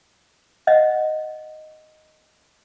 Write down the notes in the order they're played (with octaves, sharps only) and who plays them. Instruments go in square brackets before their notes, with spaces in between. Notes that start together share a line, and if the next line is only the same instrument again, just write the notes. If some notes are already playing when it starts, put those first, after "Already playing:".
[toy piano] D#5 E5 F#5